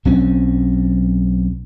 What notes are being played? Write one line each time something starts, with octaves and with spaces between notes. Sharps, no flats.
B1 F#3 C4 C#4